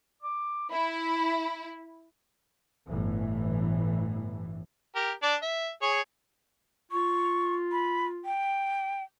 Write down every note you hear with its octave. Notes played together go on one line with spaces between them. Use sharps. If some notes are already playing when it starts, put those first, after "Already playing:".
D6
E4 B5
G1 A2 E3
G4 A#4
D4 D5
E5
G#4 C#5
F4 C#6
B5
G5